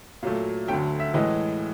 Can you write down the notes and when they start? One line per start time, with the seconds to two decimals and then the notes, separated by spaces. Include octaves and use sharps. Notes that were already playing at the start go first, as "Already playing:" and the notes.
0.23 A#2 F#3 A3 F5
0.68 D2 D3 F#3 A3 G5
1.00 E5
1.14 A2 E3 G#3 D#5